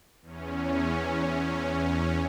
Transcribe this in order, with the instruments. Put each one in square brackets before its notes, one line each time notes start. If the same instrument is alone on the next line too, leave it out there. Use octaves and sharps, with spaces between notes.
[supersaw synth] E2 C#4